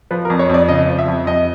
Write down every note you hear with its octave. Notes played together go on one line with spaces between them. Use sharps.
F3 B4
A#4
F2
C#5
F2 D5
C#3 D#5
F3
E5
F2
F2 D#5